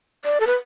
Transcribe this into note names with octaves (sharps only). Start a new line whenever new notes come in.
D5
A4
B4